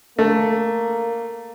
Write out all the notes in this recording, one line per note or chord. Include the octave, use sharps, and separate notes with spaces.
A3 A#3